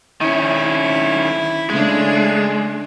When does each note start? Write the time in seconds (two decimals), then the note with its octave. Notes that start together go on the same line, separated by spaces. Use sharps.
0.21 D#3 C#4 E4
1.70 C#3 G#3 A3 D4